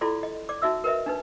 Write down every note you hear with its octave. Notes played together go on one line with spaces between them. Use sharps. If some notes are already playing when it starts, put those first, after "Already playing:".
E4 F4 A4 D5 C6
D#5
D5 D6
D#4 F#4 E5 E6
A#4 B4 D#5 E5
D4 D#4 B4